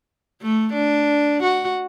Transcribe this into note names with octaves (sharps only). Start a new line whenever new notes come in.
A3
D4
F#4